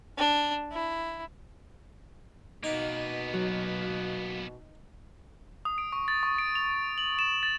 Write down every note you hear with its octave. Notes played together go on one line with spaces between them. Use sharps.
D4
E4
B2 A#3 B3 D#4
F#3
D#6
D7
C#6
A6
C#6
D7
F7
F#7
E7
A6